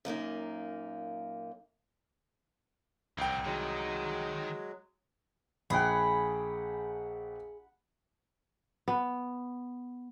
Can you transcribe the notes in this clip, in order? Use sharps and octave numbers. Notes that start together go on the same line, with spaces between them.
F#2 A#2 A#3 D#4
C2 C4 A#4 G5
D#3 F#3 G#3
A#1 G#4 F#5 G5 B5
B3